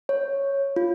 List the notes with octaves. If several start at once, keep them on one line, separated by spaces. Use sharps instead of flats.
C#5
F4